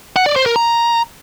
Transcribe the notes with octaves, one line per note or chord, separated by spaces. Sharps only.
F#5
D5
C5
A#4
A#5